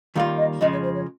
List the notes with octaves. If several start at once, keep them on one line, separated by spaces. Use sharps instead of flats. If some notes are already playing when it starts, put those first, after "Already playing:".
D#2 D#3 G3 A#3 F4 F5
D#5
F2 C#3 F3 G#3 D#5
C#5
C5
C#5